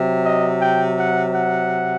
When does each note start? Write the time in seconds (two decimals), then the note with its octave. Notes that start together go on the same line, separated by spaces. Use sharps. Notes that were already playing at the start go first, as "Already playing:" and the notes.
Already playing: C3 F#3
0.25 D#5
0.61 G5
0.99 F#5
1.35 F#5